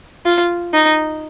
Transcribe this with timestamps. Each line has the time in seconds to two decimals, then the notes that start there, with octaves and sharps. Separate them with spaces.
0.26 F4
0.73 D#4